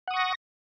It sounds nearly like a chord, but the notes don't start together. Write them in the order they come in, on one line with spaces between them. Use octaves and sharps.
F#5 D#6 C#6 A#6